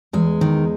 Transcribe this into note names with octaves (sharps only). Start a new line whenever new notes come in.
E2 G#3
D#3